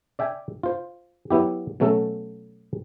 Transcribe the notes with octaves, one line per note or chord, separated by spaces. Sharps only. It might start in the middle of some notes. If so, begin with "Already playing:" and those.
D5 E5 G5 G#5
F4 C5
F#3 B3 E4 G4
B2 F#3 A3 C#4 A4